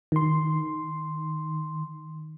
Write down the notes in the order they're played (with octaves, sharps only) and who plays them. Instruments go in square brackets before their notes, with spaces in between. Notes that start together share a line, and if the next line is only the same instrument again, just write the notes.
[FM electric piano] D#3 C6